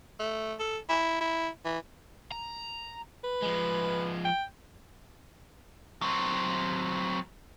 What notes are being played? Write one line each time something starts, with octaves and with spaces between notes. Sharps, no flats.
A3
A4
E4
E4
E3
A#5
B4
F3 G#3
G5
F#3 C4